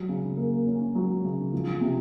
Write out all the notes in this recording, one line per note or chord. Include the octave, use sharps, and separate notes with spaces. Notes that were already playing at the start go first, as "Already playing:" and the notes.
Already playing: F#3
C#3
A#3
C#4
F#3
C#3
F3
C3